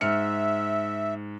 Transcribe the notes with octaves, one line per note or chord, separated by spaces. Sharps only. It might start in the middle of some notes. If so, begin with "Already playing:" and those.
G#2 E5 F6 C#7